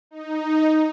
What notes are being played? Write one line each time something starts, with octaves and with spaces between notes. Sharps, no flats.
D#4